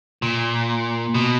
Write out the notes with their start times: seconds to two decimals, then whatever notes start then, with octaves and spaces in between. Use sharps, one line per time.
0.22 A#2
1.15 B2